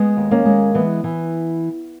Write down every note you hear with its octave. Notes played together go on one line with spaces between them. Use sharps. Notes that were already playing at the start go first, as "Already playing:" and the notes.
Already playing: G#3 B3
D#2
A#3 C#4
G#3
E3 B3
E3